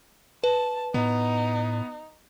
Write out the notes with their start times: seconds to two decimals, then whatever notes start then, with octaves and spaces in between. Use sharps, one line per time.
0.44 B4 A5
0.94 A2 B3 D#4